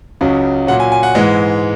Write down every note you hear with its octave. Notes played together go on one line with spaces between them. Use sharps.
C#2 C#3 F#3
A#2 F#3 F#5
G#5
G#5
F#5
G#2 E3 G#3